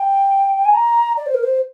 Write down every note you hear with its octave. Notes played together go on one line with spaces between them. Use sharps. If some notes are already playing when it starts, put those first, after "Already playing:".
Already playing: G5
G#5
A#5
D5
C5
A#4
C5